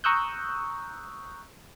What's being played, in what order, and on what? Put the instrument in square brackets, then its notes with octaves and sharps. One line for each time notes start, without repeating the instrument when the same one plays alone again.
[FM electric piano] A#5 C#6 D#6 E6 F#6 G6